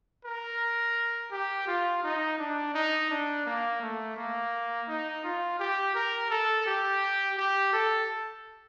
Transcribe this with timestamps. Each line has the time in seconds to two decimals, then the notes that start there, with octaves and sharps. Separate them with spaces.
0.25 A#4
1.32 G4
1.67 F4
2.03 D#4
2.39 D4
2.74 D#4
3.10 D4
3.46 A#3
3.81 A3
4.17 A#3
4.88 D#4
5.24 F4
5.59 G4
5.95 A#4
6.30 A4
6.66 G4
7.37 G4
7.73 A4